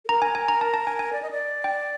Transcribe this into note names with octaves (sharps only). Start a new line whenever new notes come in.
A4
A#4 A#5
G#5
G#5
A#5
A5
A5
G#5
G#5
D5
D#5
D5
G5